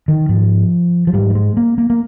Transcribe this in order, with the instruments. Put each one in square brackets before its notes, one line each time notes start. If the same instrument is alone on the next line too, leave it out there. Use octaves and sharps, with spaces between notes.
[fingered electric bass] D#3
G#2 F3
F3
G#2 G3
G3
G#3
A#3
A#3
A#3